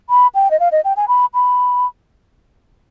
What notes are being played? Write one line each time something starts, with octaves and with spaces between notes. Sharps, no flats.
B5
G5
D#5
F5
D#5
G5
G#5
B5
B5